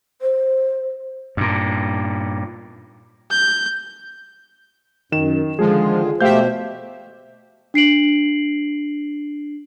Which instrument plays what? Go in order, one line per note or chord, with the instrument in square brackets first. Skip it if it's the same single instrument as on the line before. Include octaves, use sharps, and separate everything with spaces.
[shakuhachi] C5
[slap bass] G2 A#2
[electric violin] G6
[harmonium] F#2 [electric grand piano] D#3 E7
[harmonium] D3 D#3 F4 [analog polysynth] F3 G#3 [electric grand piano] G#4
[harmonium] B2 C5 [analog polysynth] A3 G4 E5 [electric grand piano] F5 G6
[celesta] D4 C7 D7 F#7